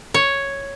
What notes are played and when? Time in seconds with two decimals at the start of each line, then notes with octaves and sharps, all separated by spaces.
0.14 C#5